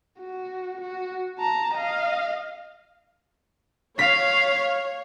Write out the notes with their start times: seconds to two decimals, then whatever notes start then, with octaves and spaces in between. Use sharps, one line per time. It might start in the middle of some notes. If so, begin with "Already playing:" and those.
0.20 F#4
0.81 F#4
1.39 A5 A#5
1.74 D#5 F5
3.99 C#5 F5 B6